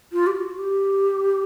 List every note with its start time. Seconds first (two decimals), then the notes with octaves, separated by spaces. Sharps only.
0.13 F4
0.27 G4
0.35 F#4
0.58 G4